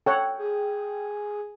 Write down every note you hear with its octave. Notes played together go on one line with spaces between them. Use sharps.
A4 C#5 F#5 G5
G#4